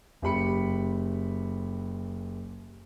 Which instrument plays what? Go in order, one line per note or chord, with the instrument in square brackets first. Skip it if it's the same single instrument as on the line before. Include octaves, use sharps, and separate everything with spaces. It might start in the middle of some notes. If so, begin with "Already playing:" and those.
[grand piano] F#1 G4 B5 C#7